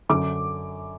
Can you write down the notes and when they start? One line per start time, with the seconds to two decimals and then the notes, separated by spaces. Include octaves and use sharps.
0.09 F#2 D3 D6